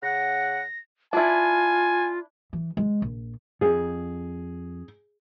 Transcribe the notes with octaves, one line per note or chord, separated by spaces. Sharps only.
C#3 F#5 A#6
D4 E4 F4 G#5
E3
G#3
A#1
F2 G#4